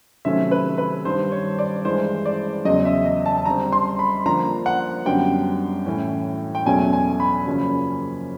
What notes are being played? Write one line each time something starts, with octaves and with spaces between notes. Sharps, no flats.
C3 D#3 F#3 A3 C#4 E5
B4
B4
G2 D#3 G3 C5
C#5
D5
G2 E3 G#3 C5
D5
E2 C#3 F#3 D#5
E5
D#5
A5
A5
D3 G3 C4 A#5
C6
B5
D3 F3 A#3 D4 A#5
F#5
F#2 D3 G3 B3 D4 G5
A2 E3 A3 C#4
G5
E2 B2 F#3 A3 C#4 G#5
G#5
B5
F#2 C#3 F3 A#3 C#4